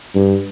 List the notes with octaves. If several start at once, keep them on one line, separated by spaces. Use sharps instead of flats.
G2